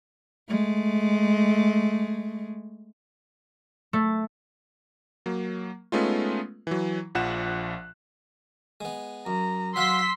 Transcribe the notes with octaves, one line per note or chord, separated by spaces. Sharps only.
G#3 A3
A3
F#3 A#3
G#3 A3 B3 C#4 D#4 F4
E3 F#3
A#1 F3 F#5 F#6 E7
G#3 B3
F#2 A#5
F#3 F5 F#5 C6 E6 B6